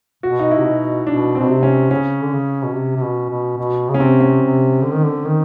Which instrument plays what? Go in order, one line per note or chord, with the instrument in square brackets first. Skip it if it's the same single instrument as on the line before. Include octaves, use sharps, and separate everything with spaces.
[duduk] B2 [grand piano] F#4
[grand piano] D#4
E4
[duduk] C3
B2
[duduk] B2 [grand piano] D4
[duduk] B2 [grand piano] C4
[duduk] C3
[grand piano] C#4
[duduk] C#3 [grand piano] C#4
[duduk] D3
C#3
B2
C3
C3
B2
B2
B2
C#3
[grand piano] C#4
[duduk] C3 [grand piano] C4
[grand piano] C#4
[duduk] C3
D3
D#3
D3
D#3